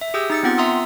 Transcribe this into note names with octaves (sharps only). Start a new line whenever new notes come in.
E5
G4 G#4 D#6 E6 G6
D#4 A6 C#7
B3 C4 F4 F#5 A6
E5 A#5 C6 D#6 E6